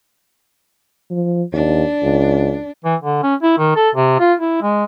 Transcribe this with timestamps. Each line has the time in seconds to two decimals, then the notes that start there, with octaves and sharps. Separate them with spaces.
1.11 F3
1.53 D#2 D4
2.03 C#2
2.84 E3
3.02 D3
3.23 C#4
3.43 E4
3.58 D#3
3.76 A4
3.95 C3
4.19 F4
4.40 E4
4.62 G#3